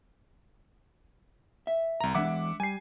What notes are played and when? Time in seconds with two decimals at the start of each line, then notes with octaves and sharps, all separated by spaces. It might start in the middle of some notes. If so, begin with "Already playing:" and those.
1.67 E5
2.01 C2 A#5
2.15 E3 G#3 D4 E5 F#5 D6
2.60 G3 G#5 C7